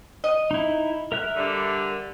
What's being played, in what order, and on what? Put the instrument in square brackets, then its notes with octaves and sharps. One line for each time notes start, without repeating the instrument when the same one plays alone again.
[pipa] D#5
[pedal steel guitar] D#4 E4
A#4 E5 F#6
[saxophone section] D3 G3